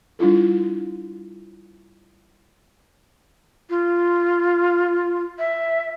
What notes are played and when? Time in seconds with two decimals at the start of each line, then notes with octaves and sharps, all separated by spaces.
0.19 G3 D4 E4 F4 A4
3.70 F4
5.39 E5